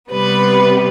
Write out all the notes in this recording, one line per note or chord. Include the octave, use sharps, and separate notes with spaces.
C3 G3 B3 B4